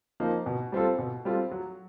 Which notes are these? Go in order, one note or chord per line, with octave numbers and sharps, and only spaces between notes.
F3 A#3 D#4
B2
G3 C4 F4 A4
B2
G3 C4 F4 A4
F#3